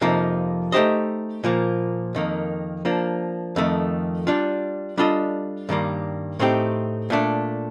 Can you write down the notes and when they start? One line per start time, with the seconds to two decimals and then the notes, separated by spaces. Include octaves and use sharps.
0.01 F2 C3 F3 A#3 D#4
0.72 A3 D#4 G4 C5 D#5
1.44 A#2 F3 A#3
2.15 F2 D#3 A#3
2.85 F3 A#3 D4
3.56 F2 D#3 A3
4.27 G3 D4 F4
4.97 G3 D4 F4 A4 D#5
5.69 G2 D#3 G3 A#3
6.39 A2 A3 C4 D#4 G4
7.10 A#2 A3 D4